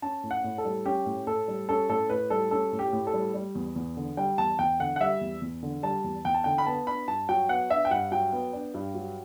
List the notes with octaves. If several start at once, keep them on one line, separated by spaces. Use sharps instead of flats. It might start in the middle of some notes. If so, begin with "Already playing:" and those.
C#4 A5
A2
F#5
A2
A4
G3
C#4 G4
A2
A2 A4
G3
C#4 A4
A2 A4
A2 B4
G3 A4
C#4 A4
A2
G4
A2
A4
G3
G3
E2
E2
D3
G3 G5
E2 A5
E2 G5
D3 F#5
F#5
G3 E5
E2
E2
D3
G3 A5
E2
E2 G5
A5
D3 G5
B5
B3 A5
D4 B5
G2 A5
F#3 G5
B3 F#5
D4 E5
G5
G2 F#5
F#3 G5
B3
D4
G2
F#3